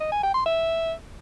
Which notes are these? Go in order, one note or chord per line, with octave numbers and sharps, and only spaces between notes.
D#5
G#5
G5
C6
E5